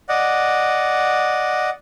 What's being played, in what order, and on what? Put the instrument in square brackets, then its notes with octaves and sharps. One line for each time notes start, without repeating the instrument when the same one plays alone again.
[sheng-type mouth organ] D5 D#5 F#5